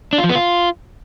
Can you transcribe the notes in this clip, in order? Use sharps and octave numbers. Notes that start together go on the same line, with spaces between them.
D4
F4
F3
B3
F4